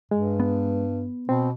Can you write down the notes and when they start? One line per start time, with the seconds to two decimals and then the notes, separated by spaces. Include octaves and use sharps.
0.11 G2 G#3
0.40 B3
1.29 B2 C4